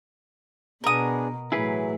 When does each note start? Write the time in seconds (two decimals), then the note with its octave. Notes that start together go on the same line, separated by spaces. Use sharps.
0.84 B2 B3 D4 G#4 A#4 D#6
1.52 A2 E3 F#3 E4 G#4 B4